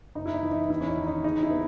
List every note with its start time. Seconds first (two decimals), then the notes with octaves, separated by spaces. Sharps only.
0.15 F#1 D#4
0.26 E4
0.34 D#4
0.42 E3
0.51 D#4
0.69 E2 E4
0.81 C#4
0.88 D#4
0.97 D#3
1.07 D#4
1.24 C#3 D#4
1.42 E4
1.51 B3